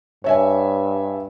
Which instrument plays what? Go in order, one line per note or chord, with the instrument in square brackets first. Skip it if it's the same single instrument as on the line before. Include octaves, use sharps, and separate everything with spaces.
[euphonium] G2 [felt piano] C#5 E5 G#5